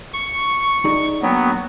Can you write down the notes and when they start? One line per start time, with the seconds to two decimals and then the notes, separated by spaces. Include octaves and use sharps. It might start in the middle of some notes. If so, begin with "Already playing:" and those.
0.13 C#6
0.85 D#4 G#4 D5
1.22 F#3 A#3 B3 D4 G5